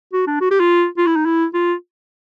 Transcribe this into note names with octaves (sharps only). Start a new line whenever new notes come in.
F#4
D4
F#4
G4
F4
F4
E4
D#4
E4
F4